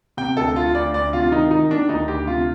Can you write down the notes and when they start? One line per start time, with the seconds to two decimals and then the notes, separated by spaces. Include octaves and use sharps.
0.17 C3 G5
0.37 D2 A4
0.56 D2 F4
0.75 D2 D5
0.94 D2 D5
1.13 C3 F4
1.32 D#3 D#4
1.51 D#3 D#4
1.70 D#3 D4
1.89 D2 D#4
2.08 D2 G4
2.27 C3 F4